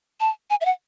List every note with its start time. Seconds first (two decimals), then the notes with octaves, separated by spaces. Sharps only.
0.20 A5
0.50 G#5
0.61 E5
0.65 F#5